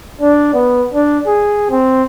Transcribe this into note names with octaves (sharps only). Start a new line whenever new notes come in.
D4
B3
D4
G#4
C4